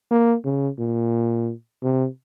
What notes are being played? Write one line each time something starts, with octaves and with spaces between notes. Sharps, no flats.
A#3
C#3
A#2
C3